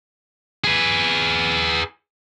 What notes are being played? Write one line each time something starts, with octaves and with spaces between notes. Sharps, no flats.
G#4 B4